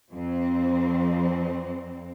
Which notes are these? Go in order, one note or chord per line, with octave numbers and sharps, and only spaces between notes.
F2 C4